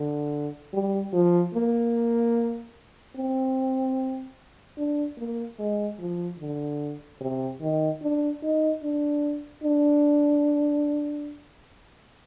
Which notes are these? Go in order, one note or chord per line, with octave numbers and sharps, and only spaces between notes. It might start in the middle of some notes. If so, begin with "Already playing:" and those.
Already playing: D3
G3
F3
A#3
C4
D4
A#3
G#3
F3
D3
C3
D#3
D4
D#4
D4
D4